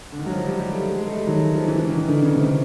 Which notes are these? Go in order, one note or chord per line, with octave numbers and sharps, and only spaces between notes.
D3
D#3
F#3
F3
G3
G3
A3
G#3
G#3
A3
G3
D#3 F#3
F3
E3
E3
D#3
E3
D3 D#3
C#3
C3